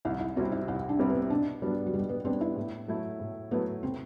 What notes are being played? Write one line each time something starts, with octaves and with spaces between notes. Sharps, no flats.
C2 E4
E4
C3 G3 C4 E4 F#4
E4
C2 E4
D4
C3 G3 C4 E4
B3
B2 D4
F#3 G3 B3 D4
F#3
B2 G3
B3
G3 B3 C4 D4
E4
A2
F#3 A3 E4
A2
F#3 A3 B3 E4
C3 C4